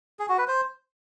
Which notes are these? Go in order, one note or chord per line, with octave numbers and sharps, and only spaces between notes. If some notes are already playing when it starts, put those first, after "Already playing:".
G#4
F#4
B4
C5